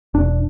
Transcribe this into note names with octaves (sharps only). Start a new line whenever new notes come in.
E1 D4